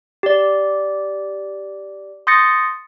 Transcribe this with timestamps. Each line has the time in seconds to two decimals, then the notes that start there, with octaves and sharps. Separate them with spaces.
0.23 G4 D5
2.27 C6 D#6 G6 A6 A#6 C#7